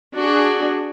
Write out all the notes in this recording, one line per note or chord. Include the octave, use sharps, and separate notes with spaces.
D4 F#4 G#4